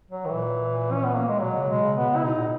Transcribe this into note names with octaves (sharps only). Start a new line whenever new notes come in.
F#3
D#3
A#2 E3
C#4
B3
A#3
G#3
B2 F#3
C#3
B2 G#3
C#3
B2 B3
C#3
E4
B2 D#4
A#2